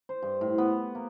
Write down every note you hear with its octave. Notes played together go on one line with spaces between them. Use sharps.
C5
G2
A2
B3
A#3